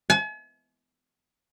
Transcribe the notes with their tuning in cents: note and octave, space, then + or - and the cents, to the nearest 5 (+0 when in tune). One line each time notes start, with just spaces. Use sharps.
G#5 +45